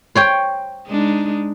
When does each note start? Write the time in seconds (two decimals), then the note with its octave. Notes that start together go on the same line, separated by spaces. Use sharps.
0.15 C5 C#5 G5
0.88 G#3 D4 D#4